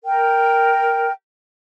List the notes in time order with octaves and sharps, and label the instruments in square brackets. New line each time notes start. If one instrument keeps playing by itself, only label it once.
[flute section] A#4 G5